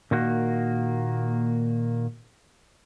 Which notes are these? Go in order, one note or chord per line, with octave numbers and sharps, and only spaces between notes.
A#2 D#3 A#3 F#4